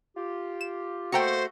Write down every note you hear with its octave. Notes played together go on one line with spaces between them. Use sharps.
F4 G4
E7
A3 A#3 F#4 C5 G5 A#5 C#7